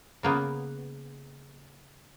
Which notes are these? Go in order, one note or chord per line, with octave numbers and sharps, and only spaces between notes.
C#3 A#3 B3